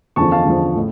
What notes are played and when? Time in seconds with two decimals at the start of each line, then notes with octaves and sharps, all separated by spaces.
0.16 E2 D3 F3 A5 C#6
0.32 F5 A5
0.46 E2 D3 F3
0.75 A2